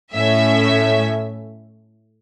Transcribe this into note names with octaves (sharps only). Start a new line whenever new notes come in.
A2 A3 C#4 E5